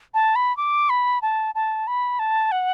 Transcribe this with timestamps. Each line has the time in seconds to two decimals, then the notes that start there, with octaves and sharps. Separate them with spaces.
0.14 A5
0.36 B5
0.57 D6
0.90 B5
1.22 A5
1.55 A5
1.87 B5
2.19 A5
2.52 F#5